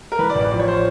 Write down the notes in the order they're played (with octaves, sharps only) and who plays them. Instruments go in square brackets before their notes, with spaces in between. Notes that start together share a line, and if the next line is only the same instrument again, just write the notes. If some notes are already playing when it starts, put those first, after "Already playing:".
[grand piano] A#4
E3 B4
D5
A1
D5
F3 D5
C#5
C5